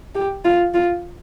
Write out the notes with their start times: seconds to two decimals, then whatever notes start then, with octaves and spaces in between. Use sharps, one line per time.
0.15 G4
0.45 F4
0.74 F4